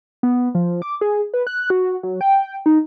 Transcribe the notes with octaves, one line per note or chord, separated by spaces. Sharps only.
B3
F3
D6
G#4
B4
F#6
F#4
F#3
G5
D#4